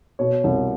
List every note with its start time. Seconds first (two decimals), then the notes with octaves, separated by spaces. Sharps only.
0.19 B2 C#5
0.44 C2